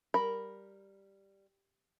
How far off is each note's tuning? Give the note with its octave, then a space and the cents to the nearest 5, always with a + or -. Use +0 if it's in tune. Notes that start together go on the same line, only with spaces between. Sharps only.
G3 +0 A#4 +0 B5 +0